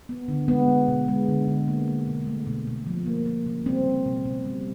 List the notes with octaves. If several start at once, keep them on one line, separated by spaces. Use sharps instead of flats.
B3
D3
G#3 B3
G#3
B2
G#3
D3
D3
A#3
A#3
B2
A3
B2
B2
F3
A#3
A#3
C#3
G3 C4
G3
B2
B2
G3